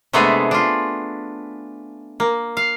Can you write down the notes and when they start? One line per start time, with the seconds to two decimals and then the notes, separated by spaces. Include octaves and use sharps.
0.13 C3 G#3 A3 B3 D4 G#4
0.51 D4 F4
2.20 A#3
2.57 F5